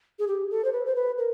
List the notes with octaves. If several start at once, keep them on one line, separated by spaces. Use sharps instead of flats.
G#4
G4
A4
C5
B4
C5
B4
A#4